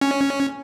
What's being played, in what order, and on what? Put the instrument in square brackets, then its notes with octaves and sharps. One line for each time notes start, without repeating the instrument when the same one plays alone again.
[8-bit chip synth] C#4